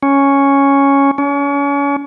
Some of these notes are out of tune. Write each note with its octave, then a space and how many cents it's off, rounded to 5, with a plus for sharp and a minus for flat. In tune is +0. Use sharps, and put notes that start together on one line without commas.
C#4 +0
C#4 +35